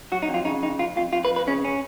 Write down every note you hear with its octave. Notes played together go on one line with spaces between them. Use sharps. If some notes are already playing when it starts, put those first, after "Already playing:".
F#3 F#4
D#4
F2
F4
C#3 D#4
F2 D#4
F2 F4
F2 F4
F2 F4
B4
F2
B4
C#3 C#4
C#4